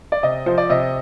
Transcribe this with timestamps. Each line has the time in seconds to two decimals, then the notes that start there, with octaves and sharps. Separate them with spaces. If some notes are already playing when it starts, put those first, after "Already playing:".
0.12 D5
0.23 C3 D#5
0.46 F3 C5
0.58 D5
0.69 C3 D#5